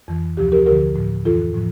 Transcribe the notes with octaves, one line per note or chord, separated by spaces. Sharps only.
F2 E3
D2 C3 F3 G4
G4 A#4
D2 D3 F3 G4 A#4
A2 F3
F2 E3 F4 A4
A2 F3